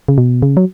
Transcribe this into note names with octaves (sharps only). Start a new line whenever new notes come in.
C#3
B2
C#3
F#3